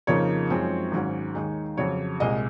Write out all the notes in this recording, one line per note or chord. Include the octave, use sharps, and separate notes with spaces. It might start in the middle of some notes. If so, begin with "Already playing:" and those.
F2 C#3 F3 A#3 D#4 C#5
F#2 F3 G#3 C4 D#4
G#1 G#2 F#3 C#4
D#2 D#3 G#3 D#4
F2 C#3 F#3 C#5
C2 A#2 G#3 D#5